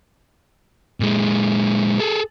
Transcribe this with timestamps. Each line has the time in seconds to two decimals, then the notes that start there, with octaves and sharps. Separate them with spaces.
1.00 A#2 G#3
1.99 G#4 A4